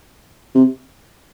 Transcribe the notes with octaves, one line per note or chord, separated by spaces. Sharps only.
C3